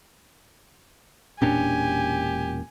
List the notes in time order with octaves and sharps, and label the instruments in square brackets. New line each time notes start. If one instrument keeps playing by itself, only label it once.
[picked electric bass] E1 A#2 C#4 [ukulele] D4 [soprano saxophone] G4 [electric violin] G#5